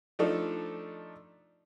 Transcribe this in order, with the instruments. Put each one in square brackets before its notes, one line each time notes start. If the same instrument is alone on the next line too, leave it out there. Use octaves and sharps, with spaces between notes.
[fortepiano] F3 A3 D4 D#4 A4